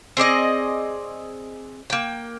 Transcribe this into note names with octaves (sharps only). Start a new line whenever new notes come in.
C4 G#4 D5 D#5
A#3 G5